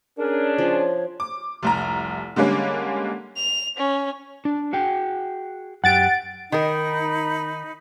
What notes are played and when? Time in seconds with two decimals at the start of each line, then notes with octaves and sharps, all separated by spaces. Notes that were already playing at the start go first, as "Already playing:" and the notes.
0.18 C#4 D4 G#4 A#4
0.58 F3 C#5
1.20 D6
1.63 F1 C2 A#5
2.36 D3 G3 G#3 A#3 C#4
3.37 F7
3.78 C#4
4.45 D4
4.73 F#4 G#4 G5
5.84 F#2 G4 F#5 A6 D7
6.52 D#3 D#4 A#4 B5